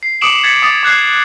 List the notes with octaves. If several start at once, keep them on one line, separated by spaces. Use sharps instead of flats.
C7
D6 D#6 C#7 D7 E7 F#7
G#6 A6 B6 C#7
D6 D#6 A6
D6 F#6 G#6 C7